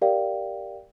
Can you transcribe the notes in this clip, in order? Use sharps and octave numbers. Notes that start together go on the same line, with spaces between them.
G4 A#4 D5 F5 G5